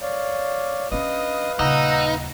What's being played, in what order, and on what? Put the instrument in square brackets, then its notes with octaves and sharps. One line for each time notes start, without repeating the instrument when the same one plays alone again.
[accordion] C#5 D5 F5
[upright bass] C#4 D4 [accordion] B4 F5 [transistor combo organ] D#5
[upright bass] D#1 C#3 [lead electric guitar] D#4 [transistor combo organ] F#5 A#5 E6